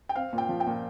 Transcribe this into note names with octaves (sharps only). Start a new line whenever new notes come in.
G5
C4 F5
A#2
G5
F3
G5
A#2